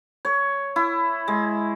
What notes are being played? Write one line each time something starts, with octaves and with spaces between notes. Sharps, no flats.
C#5
E4
G#3